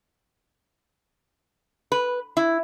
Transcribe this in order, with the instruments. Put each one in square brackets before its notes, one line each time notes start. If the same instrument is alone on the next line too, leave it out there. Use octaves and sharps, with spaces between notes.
[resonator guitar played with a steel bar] B4
E4